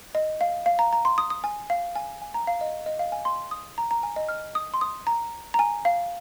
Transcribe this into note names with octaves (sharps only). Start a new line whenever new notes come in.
D#5
F5
F5
A#5
A#5
C6
D#6
D#6
G#5
F5
G#5
G#5
A#5
F5
D#5
D#5
F5
G#5
C6
D#6
A#5
A#5
G#5
D#5
F6
D#6
C6
D#6
A#5
A#5
G#5
F5